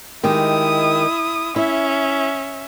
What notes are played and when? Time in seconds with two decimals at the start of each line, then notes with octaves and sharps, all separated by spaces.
0.23 D#3 G#3 E4 G4 D#6
1.56 C#4 E4 E5